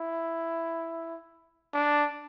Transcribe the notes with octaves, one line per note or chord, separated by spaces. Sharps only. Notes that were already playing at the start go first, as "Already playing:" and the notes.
Already playing: E4
D4